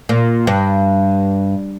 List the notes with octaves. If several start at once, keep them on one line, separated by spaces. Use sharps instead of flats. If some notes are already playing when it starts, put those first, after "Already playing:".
A#2
G2